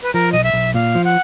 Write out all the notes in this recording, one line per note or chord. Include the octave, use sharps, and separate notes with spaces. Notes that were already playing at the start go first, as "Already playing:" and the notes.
B4
F3 A#4
B1 D#5
E5
B1
A#2 F5
F3
F#5